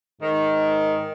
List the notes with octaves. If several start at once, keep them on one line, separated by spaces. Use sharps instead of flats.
G#2 D#3